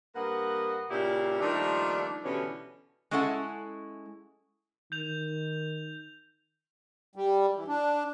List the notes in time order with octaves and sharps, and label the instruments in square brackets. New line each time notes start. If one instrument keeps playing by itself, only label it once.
[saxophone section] G2 A#3 B4 D#5 F#5
A#2 C#3 D4 E4 G4
D#3 F3 G3 A3 A#3 D4
B2 D3 E3 G3 C#4
[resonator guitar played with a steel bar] G#3 C#4 D4 E4 A4 F#5
[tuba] D#3 [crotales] G6 F7
[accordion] G3
E3
D4